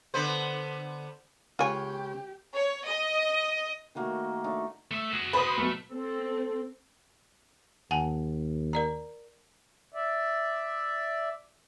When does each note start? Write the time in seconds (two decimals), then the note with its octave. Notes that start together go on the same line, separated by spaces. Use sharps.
0.14 D3 B3 C5
1.59 C#2 F4 G4 C#5 G#5
2.55 C#5
2.86 D#5
3.95 D#3 A3 A#3 F#4
4.44 A3 D4 D#4
4.91 A3 E5
5.13 F#4 G#4
5.33 B4 C5 B5 D#6
5.58 B1 B2 A3
5.92 C4 A4
7.91 D#2 F#5 G#5 A5
8.73 A#4 D5 A#5
9.94 D5 E5